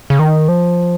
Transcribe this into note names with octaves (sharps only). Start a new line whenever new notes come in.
C#3
D#3
F3